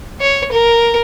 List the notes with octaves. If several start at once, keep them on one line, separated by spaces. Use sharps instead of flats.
C#5
A#4